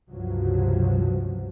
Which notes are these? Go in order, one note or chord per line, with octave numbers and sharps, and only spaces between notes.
C#2 G2 C3 F3 F#3